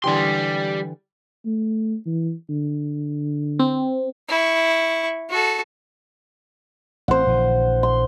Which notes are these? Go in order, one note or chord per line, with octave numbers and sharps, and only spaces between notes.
D3 E3 G3 G4 C6
A3
E3
D3
C4
E4 C#6
F#4 A4
A1 C4 C5 F#5
A#1 D3 E3
C6